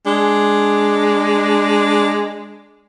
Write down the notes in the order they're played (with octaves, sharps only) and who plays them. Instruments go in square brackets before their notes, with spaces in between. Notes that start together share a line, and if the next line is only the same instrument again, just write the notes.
[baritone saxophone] G#3 [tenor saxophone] D4